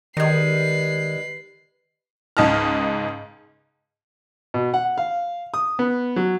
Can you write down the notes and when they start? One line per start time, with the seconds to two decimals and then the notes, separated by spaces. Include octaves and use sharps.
0.17 D#3 G3 G#3 B4 C7
2.37 C#2 G#2 D#5 A5 F6
4.54 B2
4.74 F#5
4.98 F5
5.54 D#6
5.79 B3
6.16 F#3